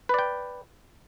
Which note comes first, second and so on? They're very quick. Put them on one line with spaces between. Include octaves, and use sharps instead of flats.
B4 D5 G5